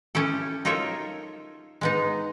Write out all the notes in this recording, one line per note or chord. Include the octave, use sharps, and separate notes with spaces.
C#4 E4 G4 A4
D#4 F4 A4 A#4 C#5 E5
G#3 B3 D#4